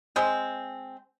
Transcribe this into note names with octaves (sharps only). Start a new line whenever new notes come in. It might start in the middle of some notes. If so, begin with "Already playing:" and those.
G#3 C4